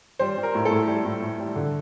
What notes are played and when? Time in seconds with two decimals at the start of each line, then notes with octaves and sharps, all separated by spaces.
0.19 G3 C5
0.38 G3
0.43 A#4
0.55 A2
0.65 A4
0.71 A2
0.88 G3
1.05 A2
1.22 A2
1.39 G3
1.56 D3